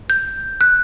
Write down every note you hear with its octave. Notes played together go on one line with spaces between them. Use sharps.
G6
F#6